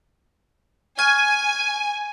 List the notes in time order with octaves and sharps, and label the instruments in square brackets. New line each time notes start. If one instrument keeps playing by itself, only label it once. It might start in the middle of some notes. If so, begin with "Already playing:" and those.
[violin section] G#5 [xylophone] C#6 F6 G#6